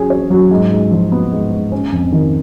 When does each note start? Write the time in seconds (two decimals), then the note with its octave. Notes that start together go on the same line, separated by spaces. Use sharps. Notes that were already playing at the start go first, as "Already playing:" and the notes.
Already playing: F#3 C#4 G#4
0.10 C#5
0.30 F#3
0.51 G#2
0.71 G#2
0.91 F3
1.12 B3
1.32 G#2
1.52 G#2
1.72 C#4
1.92 F2
2.12 D#3